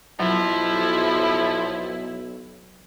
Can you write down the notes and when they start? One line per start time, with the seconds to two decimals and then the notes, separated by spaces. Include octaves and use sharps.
0.20 B1 F3 F#3 E4